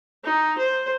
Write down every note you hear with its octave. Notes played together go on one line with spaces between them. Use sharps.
D#4
C5